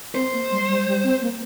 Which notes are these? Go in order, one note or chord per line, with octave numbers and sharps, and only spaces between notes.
C4 C5
A#3
G3
G3
G3
C4
A#3